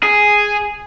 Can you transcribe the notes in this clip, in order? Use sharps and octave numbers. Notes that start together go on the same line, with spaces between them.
G#4